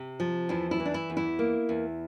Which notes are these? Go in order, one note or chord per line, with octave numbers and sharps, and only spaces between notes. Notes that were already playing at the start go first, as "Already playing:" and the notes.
Already playing: C3
F3
E2 E4
E4
E3
D4
E4
E2
E4
A#3
E2